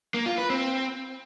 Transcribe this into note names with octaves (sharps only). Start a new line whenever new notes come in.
A#3
F4
B4
C4